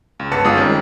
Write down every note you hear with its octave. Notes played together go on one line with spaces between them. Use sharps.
C#2
G1 B4 A5 C#7
G1 G#3 F4 D#6
D#3 G3 C4 C#4